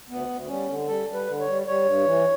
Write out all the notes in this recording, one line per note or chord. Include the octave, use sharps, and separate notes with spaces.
D2 B3
D2
G3 C#4
D3
G3 A4
G3
B4
D3
C#5
G3
G3 C#5
G2
E3